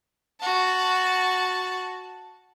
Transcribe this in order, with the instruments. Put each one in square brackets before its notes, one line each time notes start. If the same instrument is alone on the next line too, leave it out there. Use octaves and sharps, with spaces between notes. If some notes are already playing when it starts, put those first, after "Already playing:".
[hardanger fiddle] F#4 A5